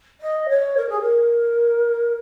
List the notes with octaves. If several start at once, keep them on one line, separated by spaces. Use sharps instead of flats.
D#5
C#5
A#4
G#4
A#4